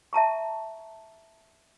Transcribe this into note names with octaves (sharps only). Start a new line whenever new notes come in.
E5 A5 A#5 C#6